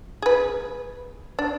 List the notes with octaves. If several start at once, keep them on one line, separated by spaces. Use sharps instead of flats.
G#4 B4
D4